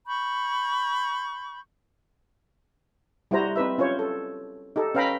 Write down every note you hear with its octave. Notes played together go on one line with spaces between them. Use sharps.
B5 C#6 G6
G3 E4 F#4 C5 A#5
C4 D#4 B4 E5
C#4 F4 C5 C#5
A4
D#4 G4 A4
C#4 B4 F5 G5 A#5 B5